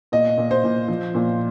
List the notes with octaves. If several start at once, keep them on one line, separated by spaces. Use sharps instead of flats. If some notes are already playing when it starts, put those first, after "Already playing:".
A#2 D#5
A#2
C5
A#2
F3
A#2